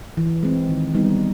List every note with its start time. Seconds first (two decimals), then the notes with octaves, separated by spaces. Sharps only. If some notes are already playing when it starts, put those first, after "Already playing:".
0.17 E3
0.43 G#3 C4
0.69 D#3
0.95 G3 B3 D#4